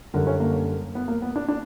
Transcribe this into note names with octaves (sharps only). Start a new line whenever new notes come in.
F#2 D3 G3 A#4
C#4
A#3
B3
A#3
B3
D4
D4